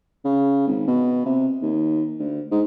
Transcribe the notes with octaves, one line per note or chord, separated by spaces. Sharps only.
C#3
G#1
B2
C3
D#2
D2
G#2